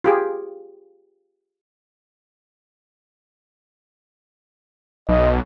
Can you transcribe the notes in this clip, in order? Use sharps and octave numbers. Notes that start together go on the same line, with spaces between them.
F4 G4 G#4
B1 D#5